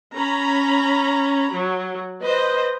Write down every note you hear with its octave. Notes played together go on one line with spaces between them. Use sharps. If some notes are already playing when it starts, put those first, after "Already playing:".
C#4 A#5 B5
F#3
B4 C5 D#5